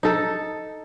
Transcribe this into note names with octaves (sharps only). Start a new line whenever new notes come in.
D#4 A4